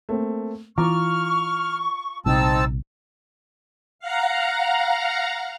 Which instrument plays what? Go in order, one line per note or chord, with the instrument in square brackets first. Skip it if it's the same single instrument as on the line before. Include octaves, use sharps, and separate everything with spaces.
[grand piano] A3 A#3 C4
[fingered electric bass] E3 [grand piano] F4 A#5 D6 [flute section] C#6 [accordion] F6
[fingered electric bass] A#1 C3 G3 [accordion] C4 A5 E6 [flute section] D#4
[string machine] F5 F#5 A#5